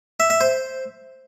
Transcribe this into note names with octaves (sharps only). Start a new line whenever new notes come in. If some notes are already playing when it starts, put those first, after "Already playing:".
E5
E5
C5